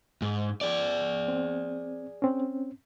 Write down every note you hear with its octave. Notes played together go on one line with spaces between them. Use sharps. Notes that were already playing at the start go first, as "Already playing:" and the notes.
G#2
G#4 D5
C4
C4 C#4